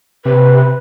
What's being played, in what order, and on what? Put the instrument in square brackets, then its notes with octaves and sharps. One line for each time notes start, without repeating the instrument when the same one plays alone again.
[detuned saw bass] C3 [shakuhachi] B4